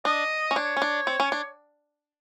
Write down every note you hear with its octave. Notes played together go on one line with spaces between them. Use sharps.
D4 D#5
C#4
D4 C#5
C#4
D4
C4
C#4
D4